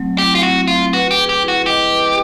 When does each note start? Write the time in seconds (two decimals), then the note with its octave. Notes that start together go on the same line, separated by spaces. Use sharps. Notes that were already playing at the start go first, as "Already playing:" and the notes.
Already playing: F#3 A3 C4
0.18 E4 G4
0.35 F4
0.43 C4 F#4
0.68 A3 F4
0.93 F#4 B4
1.11 G4
1.18 G#4
1.29 G4
1.42 E4
1.48 F#4
1.66 G4 D#5
1.91 B4